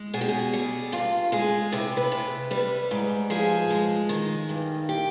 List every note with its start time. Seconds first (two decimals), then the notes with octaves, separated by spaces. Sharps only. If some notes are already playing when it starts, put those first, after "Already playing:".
Already playing: G#3
0.14 B2 G#4
0.21 G4
0.29 G#4
0.54 G3
0.92 G2 F4
1.32 G#3 G#4
1.72 C3 B4
1.97 B4
2.12 C3
2.51 G3 B4
2.91 G#2
3.30 F3 G#4
3.71 G#3
4.09 D#3
4.49 G2
4.89 G4